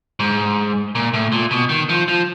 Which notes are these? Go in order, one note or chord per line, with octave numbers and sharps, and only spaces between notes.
G#2
A#2
A2
A#2
B2
D#3
F3
F3